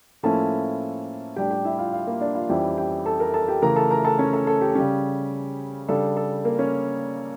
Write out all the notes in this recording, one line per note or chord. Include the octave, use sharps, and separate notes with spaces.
A2 F3 A#3 C#4 E4 A4 A5
A2 G3 D4 G4 G5
G4 G5
E4 E5
F4 F5
F4 F5
A#3 A#4
D4 D5
F4 F5
F2 E3 G3 C#4 E4 G4 G5
G4 G5
A4 A5
A#4 A#5
A4 A5
G4 G5
C#3 E3 A3 A#4 A#5
A4 A5
A#4 A#5
A4 A5
C#4 C#5
A4
A4
G4
C#3 G3 C#4
C#3 G3 D4 A4
A4
A#3 A#4
C#4 C#5